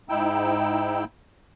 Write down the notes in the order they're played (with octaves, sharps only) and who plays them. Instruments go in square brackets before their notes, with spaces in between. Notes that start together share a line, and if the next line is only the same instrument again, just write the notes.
[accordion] G#2 D#4 E4 G5 E6